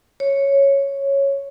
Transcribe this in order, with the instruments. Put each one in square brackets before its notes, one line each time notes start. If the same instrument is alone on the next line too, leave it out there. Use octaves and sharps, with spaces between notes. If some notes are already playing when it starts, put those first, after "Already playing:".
[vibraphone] C#5